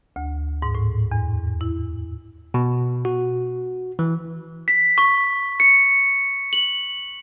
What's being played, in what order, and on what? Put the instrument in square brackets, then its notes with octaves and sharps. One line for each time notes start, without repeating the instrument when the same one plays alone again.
[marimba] D2
G#2
A2
E2
E4
[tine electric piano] B2
F#4
E3
[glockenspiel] B6
C#6
C#7
F#7